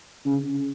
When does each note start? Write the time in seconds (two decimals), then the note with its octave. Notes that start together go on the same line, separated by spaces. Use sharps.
0.25 C#3